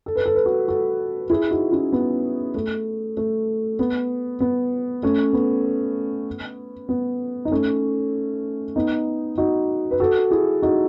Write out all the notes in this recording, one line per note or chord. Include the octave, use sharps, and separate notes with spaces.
A4
B4
A4
B4
F#4 A4
F#4 A4
E4 G#4
D#4 F#4
C#4 E4
B3
A3
A3
B3
B3
A3 C#4
B3
B3
D#4
A3 C#4
B3 D#4
D#4 F#4
B4
F#4 A4
E4 G#4
D#4 F#4